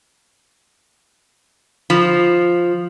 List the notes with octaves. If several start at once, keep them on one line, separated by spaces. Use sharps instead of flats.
F3